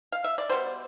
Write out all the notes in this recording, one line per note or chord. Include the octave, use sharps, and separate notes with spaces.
F5
E5
D5
B2 G3 B3 C5